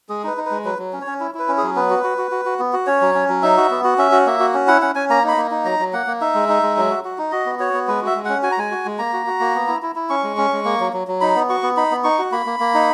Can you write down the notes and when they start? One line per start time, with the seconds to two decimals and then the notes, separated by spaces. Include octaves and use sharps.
0.09 G#3 G#4
0.24 D#4 B4
0.37 D#4
0.46 B4
0.51 G#3
0.65 F#3 B4
0.79 F#3
0.93 C#4
1.01 C#5
1.07 C#4
1.20 E4
1.35 E4 B4
1.48 C#4
1.58 G#4
1.63 F#3
1.76 B3 B4
1.90 F#4
2.03 F#4
2.18 F#4
2.31 F#4
2.45 F#4
2.59 B3
2.73 F#4
2.87 C#4 C#5
3.01 F#3
3.14 C#4
3.28 F#3
3.42 D#4 E5
3.57 F#4
3.70 B3
3.84 F#4
3.98 C#4 E5
4.12 F#4
4.26 A#3 E5
4.40 F#4
4.54 C#4
4.67 E4 F#5
4.82 C#4 F#5
4.95 C#4 G#5
5.09 A#3 A#5
5.24 D#4 B5
5.37 A#3
5.51 D#4
5.65 F#3 A#5
5.79 F#3
5.93 A#3 F#5
6.07 A#3
6.21 D#4 E5
6.34 G#3
6.49 D#4
6.63 G#3
6.77 F#3
6.90 F#4
7.05 F#4
7.18 D#4
7.31 F#4 D#5
7.46 B3
7.59 F#4 C#5
7.73 B3
7.88 G#3 B4
8.02 F#4 E5
8.15 G#3
8.25 C#4 F#5
8.43 F#4 G#5
8.52 A#5
8.58 G#3 G#5
8.71 F#4
8.85 G#3
8.98 A#3 A#5
9.13 F#4
9.26 F#4
9.40 A#3
9.55 B3
9.68 E4
9.82 E4
9.96 E4
10.10 C#4 C#6
10.23 G#3
10.37 C#4
10.52 G#3
10.65 A#3
10.80 F#3
10.93 F#3
11.08 F#3
11.21 D#4 B5
11.35 B3
11.49 F#4 C#6
11.63 B3
11.76 D#4 B5
11.91 B3
12.04 D#4 C#6
12.19 F#4
12.32 A#3 B5
12.46 A#3
12.60 A#3
12.74 D#4